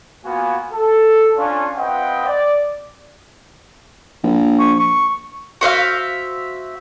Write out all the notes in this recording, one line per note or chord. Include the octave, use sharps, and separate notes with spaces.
A#3 B3 F4 F#4 G#5
A4
C#4 D4 F4
C4 F4 B4 D#5 F#5 G5
D5
A#1
C#6
C#6
F#4 C5 E5 F5